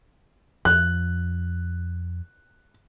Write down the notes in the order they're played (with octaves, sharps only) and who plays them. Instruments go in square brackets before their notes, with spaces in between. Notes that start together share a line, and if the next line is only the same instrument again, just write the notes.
[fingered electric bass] F2 [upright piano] F#6